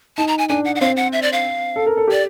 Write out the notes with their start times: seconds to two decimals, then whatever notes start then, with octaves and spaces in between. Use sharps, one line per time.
0.17 D#4 A5
0.28 A#5
0.38 G#5
0.49 D4 G#5
0.65 F#5
0.75 F#5
0.81 C4 F5
0.97 F#5
1.13 E5
1.22 D5
1.33 F5
1.76 A4
1.86 A#4
1.97 A4
2.08 G4 D5